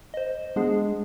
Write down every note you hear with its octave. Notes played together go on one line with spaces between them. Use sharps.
C5 D#5
G#3 B3 D4 G#4